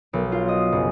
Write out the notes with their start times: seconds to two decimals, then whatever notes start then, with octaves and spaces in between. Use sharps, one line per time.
0.13 B1
0.32 F4
0.48 D#5
0.72 F#1